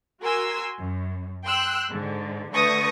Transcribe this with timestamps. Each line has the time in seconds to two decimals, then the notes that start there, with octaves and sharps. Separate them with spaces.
0.22 F#4 A#4 G#5 C6 E6
0.79 F#2
1.44 G5 C6 E6 F#6
1.89 G#2 D3
2.53 D3 A3 B4 C#6 D#6 A#6